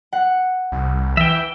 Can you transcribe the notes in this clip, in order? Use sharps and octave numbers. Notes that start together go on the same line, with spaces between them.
F#5
C2
E3 E5 G5